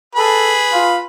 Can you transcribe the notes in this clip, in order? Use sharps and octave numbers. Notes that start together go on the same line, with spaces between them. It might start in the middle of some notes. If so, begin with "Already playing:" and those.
G#4 A4 B4
F4